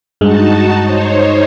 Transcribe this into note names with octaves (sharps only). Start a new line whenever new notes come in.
G2 G#3 D#4 F#4 A5
D#4 C5 C#5